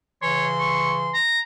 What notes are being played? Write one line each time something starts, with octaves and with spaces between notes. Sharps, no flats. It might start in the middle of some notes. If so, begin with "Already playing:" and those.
C#3 E3 C#5 C6
C#6
A#5